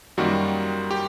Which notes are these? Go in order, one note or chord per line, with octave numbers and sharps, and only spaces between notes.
F#2 D#3 G3 A#3 F#4
G4